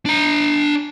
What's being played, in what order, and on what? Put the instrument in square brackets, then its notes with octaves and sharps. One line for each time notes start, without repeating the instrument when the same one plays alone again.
[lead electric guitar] D4 A#5